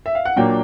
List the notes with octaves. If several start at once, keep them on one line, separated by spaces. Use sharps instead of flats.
E5
F5
F#5
A#2 F#3 A#3 D4 G5